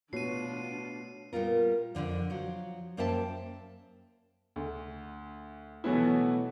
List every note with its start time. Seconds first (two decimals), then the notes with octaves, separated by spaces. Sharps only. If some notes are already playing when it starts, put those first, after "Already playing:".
0.13 B2 A3 D4 F4 C#5 C7 D#7
1.33 A#2 G3 B3 F4 A#4
1.95 F2 A#2 D3 F3
2.30 F3 F#3
2.97 F#2 A#3 C5 E5 G5 A5
4.56 D2
5.84 B2 E3 F#3 A3 B3 E4